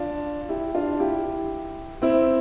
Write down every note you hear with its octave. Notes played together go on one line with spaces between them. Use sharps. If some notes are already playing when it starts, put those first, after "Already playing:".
Already playing: D4 F4
E4 G4
D4 F4
E4 G4
C4 E4